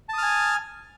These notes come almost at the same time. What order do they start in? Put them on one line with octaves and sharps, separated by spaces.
A5 D#6 F6 G#5